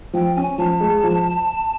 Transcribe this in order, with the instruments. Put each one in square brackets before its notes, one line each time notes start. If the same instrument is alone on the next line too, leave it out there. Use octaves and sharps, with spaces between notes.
[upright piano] F3 [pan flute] G5
[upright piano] C#4 [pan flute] G#5
[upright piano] F3 [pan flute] A5
[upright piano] G#3
F3